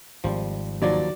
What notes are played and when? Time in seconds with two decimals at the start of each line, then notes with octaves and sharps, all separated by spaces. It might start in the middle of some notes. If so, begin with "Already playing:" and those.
0.24 G#1 G#2 F3 G3 C5
0.82 D#2 F3 F#3 D5 A#5